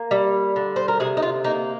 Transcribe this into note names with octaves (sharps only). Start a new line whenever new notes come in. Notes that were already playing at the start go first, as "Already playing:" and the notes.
Already playing: A#3
G3
D3
C5
A#4
C3 G#4
D#4
F4
A#3 D#4